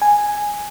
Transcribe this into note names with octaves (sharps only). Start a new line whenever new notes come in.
G#5